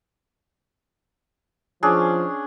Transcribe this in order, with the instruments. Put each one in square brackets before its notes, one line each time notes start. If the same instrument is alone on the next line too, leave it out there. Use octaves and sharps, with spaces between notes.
[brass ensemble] F3 [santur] C#4 D4 G#4